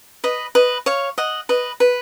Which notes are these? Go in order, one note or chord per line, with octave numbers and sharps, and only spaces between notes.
B4 D#5
B4 D#5
C#5 F5
D#5 F#5
B4 D#5
B4